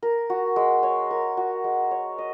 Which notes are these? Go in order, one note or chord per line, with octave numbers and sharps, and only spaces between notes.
A#4
F#4
G#3
C#5
A#4
F#4
G#3
C#5
D#5